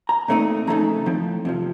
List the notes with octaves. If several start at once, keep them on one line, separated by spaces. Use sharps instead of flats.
A#5
A#2 A3 C4 D#4
F2 C#3 A3 D#4 A#5
A2 F3 C4
F2 C3 F3